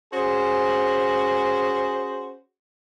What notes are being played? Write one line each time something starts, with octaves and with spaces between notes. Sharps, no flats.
C#4 F#4 G#4 C5